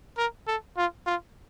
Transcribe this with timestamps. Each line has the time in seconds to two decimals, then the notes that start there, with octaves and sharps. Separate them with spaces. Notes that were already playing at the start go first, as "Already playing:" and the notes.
0.17 A#4
0.47 A4
0.77 F4
1.07 F4